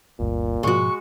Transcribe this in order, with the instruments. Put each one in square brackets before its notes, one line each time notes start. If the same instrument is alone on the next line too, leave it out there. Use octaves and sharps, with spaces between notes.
[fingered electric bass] G1 D2 G2 [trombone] A#2
[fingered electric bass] G#2 B2 F3 [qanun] G#3 F#4 [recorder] C#6